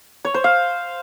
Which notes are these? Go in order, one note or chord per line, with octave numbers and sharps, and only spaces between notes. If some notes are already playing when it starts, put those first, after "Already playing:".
C#5
C5
F5